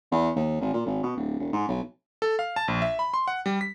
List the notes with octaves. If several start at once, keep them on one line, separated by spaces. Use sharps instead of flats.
E2
D#2
G#1
A#2
G#1
B2
D1
E1
G#2
B1
A4
F5
A5
A#1
E5
B5
C6
F#5
G3
B6